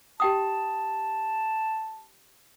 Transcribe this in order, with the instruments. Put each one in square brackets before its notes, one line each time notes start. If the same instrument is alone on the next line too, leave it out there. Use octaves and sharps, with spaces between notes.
[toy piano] G4 G5 D#6 [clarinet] A5